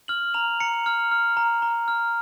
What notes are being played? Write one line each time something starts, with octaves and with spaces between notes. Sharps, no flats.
F6 F#7
A#5 F7
A#5 C#7
F6
F6
A#5
A#5
F6